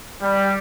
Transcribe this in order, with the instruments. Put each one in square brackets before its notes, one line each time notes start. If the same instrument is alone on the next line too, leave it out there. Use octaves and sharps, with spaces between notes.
[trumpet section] G3